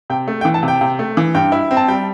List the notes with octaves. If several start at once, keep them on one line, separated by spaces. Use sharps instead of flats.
C3 G5
A3
G5
E3
A5
C3
G5
C3
A3
E3
G2 G5
E4
C4
A5
G3 G5